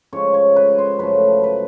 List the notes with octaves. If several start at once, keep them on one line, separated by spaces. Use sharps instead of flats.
C#3 F3 G#3 C#5
C#5
B4
C5
F#2 C#3 F3 A3 B4
B4